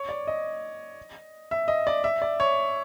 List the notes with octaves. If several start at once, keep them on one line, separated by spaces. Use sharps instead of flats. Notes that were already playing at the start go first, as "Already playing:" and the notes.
Already playing: C#5
D5
D#5
E5
D#5
D5
E5
D5
C#5